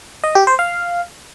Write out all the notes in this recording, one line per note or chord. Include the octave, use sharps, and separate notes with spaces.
D#5
G4
C5
F5